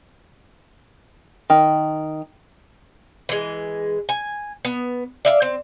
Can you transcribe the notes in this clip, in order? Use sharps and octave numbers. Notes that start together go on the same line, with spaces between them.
D#3
E3 G#3
G#5
B3
D5 E5 F5
C4